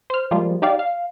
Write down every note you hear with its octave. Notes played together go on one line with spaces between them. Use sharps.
C5 F6
F3 G3 G#3 A#3 F4
D#4 G4 D5 F5
F5